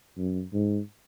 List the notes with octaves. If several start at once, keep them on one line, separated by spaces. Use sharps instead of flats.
F#2
G#2